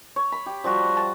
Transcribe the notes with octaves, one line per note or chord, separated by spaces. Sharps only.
C#5
B5
G4
F3 G3 F#4
F#5 A5